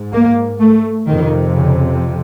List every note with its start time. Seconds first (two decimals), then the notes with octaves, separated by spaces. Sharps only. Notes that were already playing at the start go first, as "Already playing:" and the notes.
Already playing: G#2
0.13 A#3
0.60 A3
1.07 F2 C3 D#3
1.55 C#3